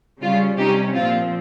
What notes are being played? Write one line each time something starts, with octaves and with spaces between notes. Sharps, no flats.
C#3 G3 C#4 F4
C3 G3 C#4 D#4 G4
A#2 F3 C4 F4